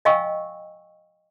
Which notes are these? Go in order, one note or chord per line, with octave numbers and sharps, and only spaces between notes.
D#5 F5 G5 G#5 C#6 E6